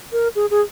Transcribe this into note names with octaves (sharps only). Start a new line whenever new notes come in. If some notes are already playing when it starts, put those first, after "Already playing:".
A#4
G#4
G#4